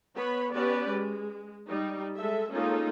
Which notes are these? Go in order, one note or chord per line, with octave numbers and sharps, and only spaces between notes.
B3 B4 C#5 B5
B3 C#4 G4 B4 D5
G#3
G3 D#4
G#3 A4 E5
G#3 A#3 C#4 D#4 F4 A4